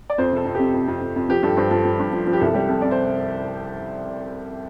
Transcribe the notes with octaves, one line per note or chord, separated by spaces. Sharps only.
D5
F2 C5
C3 A4
F2
C3 G4
F2
F2
F2
F2
F3 G4
G2 A4
G2 C5
F3 A4
F3
G2
F3
F3
G4
C2 A4
G3 G4
C3 A4
C3 D5
C5